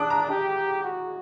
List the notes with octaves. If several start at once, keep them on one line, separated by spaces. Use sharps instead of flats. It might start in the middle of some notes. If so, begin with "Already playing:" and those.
Already playing: D4 D6 D#6 F#6
A#5
G4
F#4